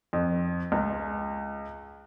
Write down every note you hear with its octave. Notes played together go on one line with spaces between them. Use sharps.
F2
C#2